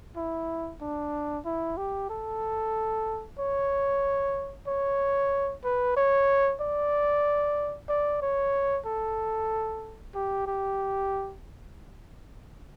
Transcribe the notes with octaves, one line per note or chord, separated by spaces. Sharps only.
E4
D4
E4
G4
A4
C#5
C#5
B4
C#5
D5
D5
C#5
A4
G4
G4